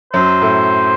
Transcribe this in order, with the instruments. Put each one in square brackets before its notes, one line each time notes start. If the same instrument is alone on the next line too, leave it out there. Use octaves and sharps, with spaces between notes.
[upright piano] F#2 F#3 [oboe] C5
[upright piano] A2 A3